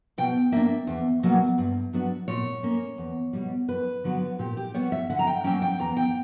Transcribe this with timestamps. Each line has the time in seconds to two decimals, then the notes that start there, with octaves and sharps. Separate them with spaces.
0.18 B2 G5
0.52 A#3 D4 E5
0.87 E2
1.23 B2 F#3 A#3
1.58 G2
1.93 F#3 B3 D4
2.28 A#2 C#5
2.63 A#3 C#4
2.98 E2
3.33 B2 G3
3.68 F#2 B4
4.04 D3 F#3 B3
4.39 A#2 G4
4.57 G4
4.74 G3 B3 C#5
4.92 E5
5.09 D3 F#5
5.19 A#5
5.27 G5
5.44 F#3 A#3 C#4 G5
5.62 G5
5.79 E2 A#5
5.97 G5